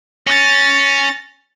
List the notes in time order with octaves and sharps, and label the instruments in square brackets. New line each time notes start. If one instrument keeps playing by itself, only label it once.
[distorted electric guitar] C#4 [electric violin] A6 A#6